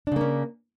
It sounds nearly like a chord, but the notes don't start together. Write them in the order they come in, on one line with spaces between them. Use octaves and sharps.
D4 C#3 A#3 C#4